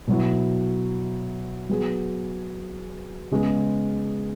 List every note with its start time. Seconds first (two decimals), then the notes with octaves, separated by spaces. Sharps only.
0.07 B2 F#3 E4
1.69 F#3 B3 G#4
3.31 C#3 G#3 B3 G#4